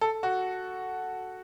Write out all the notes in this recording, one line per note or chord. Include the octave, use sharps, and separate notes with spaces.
A4
F#4